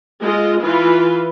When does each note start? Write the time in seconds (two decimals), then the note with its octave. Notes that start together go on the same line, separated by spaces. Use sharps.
0.22 G#3 F4 D#5
0.63 E3 F4 B4